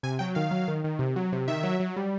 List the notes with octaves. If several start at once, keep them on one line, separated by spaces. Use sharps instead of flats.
C3 G#5
F#3 G5
D#3 F5
F#3
D#3
D#3
C3
F#3
C3
D#3 E5
F#3
F#3
G3